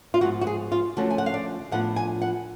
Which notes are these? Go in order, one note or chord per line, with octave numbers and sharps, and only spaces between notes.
F4
G#2 F3 B3 F#4
F#4
G#4
F4
D3 F3 A3 C#4 F#4
G#5
F#5
F5
D5
A2 F3 B3 D4 F4 F#5
G#5
F#5